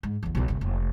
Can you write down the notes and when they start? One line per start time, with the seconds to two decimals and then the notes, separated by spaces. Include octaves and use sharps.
0.03 G#2
0.23 A1 E2
0.35 B1 B2
0.48 G1 C3
0.61 F1